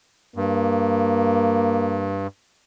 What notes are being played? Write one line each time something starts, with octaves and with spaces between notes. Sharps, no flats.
G2 A#3